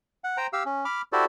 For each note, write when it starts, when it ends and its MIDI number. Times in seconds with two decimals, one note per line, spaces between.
0.24 0.37 78
0.37 0.47 72
0.37 0.47 79
0.37 0.47 82
0.53 0.63 67
0.53 0.63 77
0.53 0.63 88
0.66 0.84 61
0.85 1.02 83
0.85 1.02 86
0.85 1.02 89
1.13 1.25 64
1.13 1.25 66
1.13 1.25 67
1.13 1.25 69
1.13 1.25 72
1.13 1.25 74